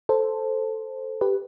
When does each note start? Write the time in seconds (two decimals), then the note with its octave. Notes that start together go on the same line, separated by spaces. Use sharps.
0.09 A4 C5
1.21 G4 B4